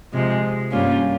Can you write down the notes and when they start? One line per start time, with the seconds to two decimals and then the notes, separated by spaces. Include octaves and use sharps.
0.12 C3 F3 G#3
0.72 G2 G3 A#3 C#4 F4